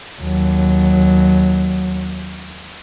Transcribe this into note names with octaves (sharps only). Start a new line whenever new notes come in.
D#2 F#3